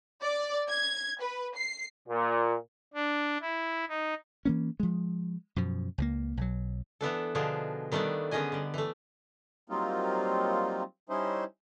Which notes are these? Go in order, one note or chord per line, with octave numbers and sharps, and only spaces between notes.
D5
G#6
B4
C7
A#2
D4
E4
D#4
E3 A#3 C#4
F3 G#3
F#2 B2 F3
C#2 F3 A#3
B1 F#3
E3 B3 D4 A4
B2 D3 F3 D4 D#4 G#4
D#3 G3 A3 B3 D4
D3 B3 C#4 G#4 D#5 G#5
D3 G3
E3 A3
F#3 G3 A#3 C4 D#4 F4
G3 C#4 D#4 E4 C5